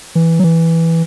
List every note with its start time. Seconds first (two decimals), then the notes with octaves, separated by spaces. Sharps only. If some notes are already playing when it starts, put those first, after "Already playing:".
0.15 E3
0.39 F#3
0.44 E3